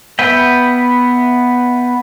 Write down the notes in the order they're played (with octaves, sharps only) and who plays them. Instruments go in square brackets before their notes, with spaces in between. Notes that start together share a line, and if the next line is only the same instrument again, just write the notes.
[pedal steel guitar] B3 B4 E5 G5